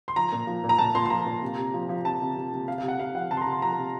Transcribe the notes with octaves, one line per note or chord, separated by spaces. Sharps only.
C6
F3 A#5
A#2
F3
A#2
A#5
A#2 A5
A#2 C6
C6
F3 A#5
A#2
C3
C3
F3
F3
C3 A5
C3
C3
C3
C3 F5
F5
C3
F#5
C3 F5
F3 F#5
C3 A5
C6
A#5
C3
C6
F3 A#5
C3